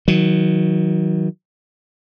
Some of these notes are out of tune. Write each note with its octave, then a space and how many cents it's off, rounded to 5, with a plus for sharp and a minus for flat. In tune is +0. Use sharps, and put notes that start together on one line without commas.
D#3 +35 F#3 +0